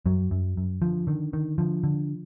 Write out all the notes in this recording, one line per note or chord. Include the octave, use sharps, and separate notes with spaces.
F#2 F#3
F#2
F#2
D3 F3
D3 D#3
D3 D#3
D3 F3
D3